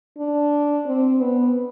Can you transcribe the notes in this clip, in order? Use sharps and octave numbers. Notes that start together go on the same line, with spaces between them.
D4
C4
B3